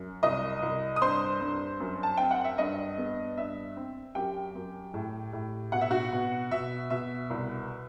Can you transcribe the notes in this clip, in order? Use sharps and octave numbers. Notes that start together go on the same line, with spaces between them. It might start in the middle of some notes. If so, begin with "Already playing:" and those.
Already playing: F#2
C2 D#5 D#6
C2
D#6
G2 C5 C6
G2
F#2
A5
C4 G5
F#5
E5
G2 D#5
B3
G2 E5
C4
F#2 G4 G5
F#2
A2
A2
B2 F#5
E5
F#4 F#5
B2
B2 E5
B2 E5
C2